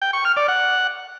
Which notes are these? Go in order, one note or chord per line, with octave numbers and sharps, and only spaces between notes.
G5
C#6
F6
D5
F#5